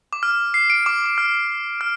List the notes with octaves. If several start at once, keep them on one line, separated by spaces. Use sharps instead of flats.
D6
F6
C7
D7
D6
D6
F6
F6